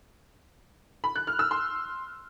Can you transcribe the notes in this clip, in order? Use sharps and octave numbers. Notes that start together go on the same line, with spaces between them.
B5
F#6
F6
E6
C6